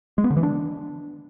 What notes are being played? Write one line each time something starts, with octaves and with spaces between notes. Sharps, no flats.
G#3
B3
D3
E3
D4